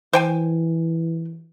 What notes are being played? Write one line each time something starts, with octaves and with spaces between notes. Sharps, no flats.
E3 C5 G5 G#5